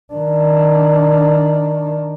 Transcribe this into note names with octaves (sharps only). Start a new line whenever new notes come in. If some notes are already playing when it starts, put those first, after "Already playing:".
D#3 D4